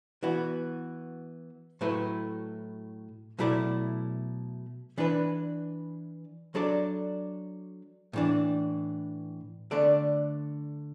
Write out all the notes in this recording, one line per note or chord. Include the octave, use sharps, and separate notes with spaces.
E3 B3 F#4
A2 F#3 A3 E4 B4
B2 F#3 A3 E4 D5
E3 D4 B4
F#3 D4 A4 D5
A2 E3 D4
D3 A3 D4 A4 D5